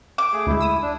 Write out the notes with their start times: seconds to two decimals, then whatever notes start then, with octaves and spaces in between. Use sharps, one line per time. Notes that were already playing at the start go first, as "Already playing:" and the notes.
0.18 D6
0.33 A3 G#4
0.47 D2 G#3 E4
0.61 D#6 E6
0.82 D4